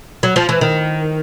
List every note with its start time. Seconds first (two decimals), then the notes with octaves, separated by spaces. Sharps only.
0.23 F#3
0.36 F3
0.49 E3
0.61 D#3